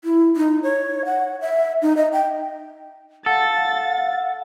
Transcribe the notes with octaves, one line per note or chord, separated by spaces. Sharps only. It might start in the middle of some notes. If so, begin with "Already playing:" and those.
E4
D#4
C#5
F#5
E5
D#4
D#5
G5
A4 F5 F#5 A6